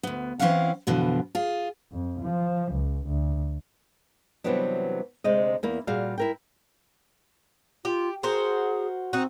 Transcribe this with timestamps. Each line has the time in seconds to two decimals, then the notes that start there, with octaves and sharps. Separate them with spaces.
0.03 D2 B3
0.39 E3 C4 C#4 E4 F5 F#5
0.87 F2 B2 D3 E3
1.35 F4 G#4
1.92 F2
2.21 F3
2.73 C#2
3.07 D2
4.44 C3 E3 F#3 G3 B3 D4
5.24 D2 C3 G#3 D#5
5.63 E2 A#3 E4
5.87 A#2 G3 F#4 G#4 F5
6.18 E4 A#4 G5
7.85 F4 G4
8.23 F#4 G#4 A#4 C5
9.13 C4 D#4 F#4